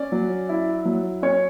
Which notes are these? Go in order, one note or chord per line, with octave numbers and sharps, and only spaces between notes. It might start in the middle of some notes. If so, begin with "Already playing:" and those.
Already playing: C#4 D5
F#3
E4
F#3
C#4 C#5